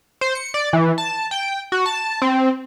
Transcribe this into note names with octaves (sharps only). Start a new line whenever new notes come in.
C5
C#7
D5
E3
A5
G5
F#4
A5
C4